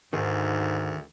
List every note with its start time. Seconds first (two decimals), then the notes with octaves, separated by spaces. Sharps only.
0.13 D2 G#2 D#3 G#4